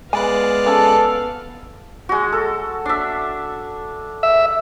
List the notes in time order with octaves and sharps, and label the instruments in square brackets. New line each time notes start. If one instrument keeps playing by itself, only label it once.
[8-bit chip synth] G#3 D5 F#6 [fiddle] B3 F5 [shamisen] G#5 B5
[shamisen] C#4 G#4 [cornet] A4
[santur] G#3 F#4
A4
D4 E5
[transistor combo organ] E5